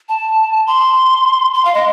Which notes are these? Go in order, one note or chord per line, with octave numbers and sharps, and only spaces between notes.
A5
C6
C6
F5
D#5